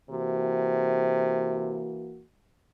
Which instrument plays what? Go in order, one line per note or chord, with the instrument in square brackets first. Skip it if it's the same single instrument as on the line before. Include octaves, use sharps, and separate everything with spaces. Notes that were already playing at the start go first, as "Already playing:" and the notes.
[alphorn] C3 [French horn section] E3 A#3 F#4